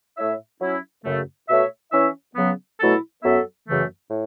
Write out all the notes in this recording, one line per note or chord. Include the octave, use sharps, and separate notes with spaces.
A2 A3 E4 C#5 E5
F#3 C#4 E4
F#2 C#3 A3
B2 A3 F#4 C#5 E5
E3 C#4 E4 C#5 E5
C#3 F#3 B3
B2 F#3 A3 E4 A4
F#2 F#3 B3 A4 E5
F#2 C#3 E3 A3
A2